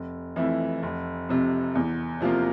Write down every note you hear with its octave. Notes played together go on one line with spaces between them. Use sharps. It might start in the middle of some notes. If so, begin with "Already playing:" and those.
Already playing: F1
F2 E3 A3 E4
F1
F2 C3
E2
C3 F3 A#3 F4